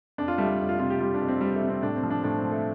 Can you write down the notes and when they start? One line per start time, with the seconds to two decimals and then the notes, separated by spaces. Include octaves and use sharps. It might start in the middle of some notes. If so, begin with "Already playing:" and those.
0.18 F2 D4
0.28 F4
0.38 G3 A3
0.49 A3
0.60 F2
0.69 F4
0.79 C3 F4
0.90 G4
1.00 G3 F4
1.14 D4
1.21 F2
1.28 C4
1.41 G3
1.55 A3
1.63 C3
1.70 C4
1.83 A2 D4
1.96 C4
2.03 F3
2.10 D4
2.24 A2 D4
2.38 C4
2.45 F3
2.51 A3